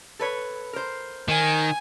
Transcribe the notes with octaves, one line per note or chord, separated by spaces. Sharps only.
A4 B4 C#5
A#4 C5
D#3 G#5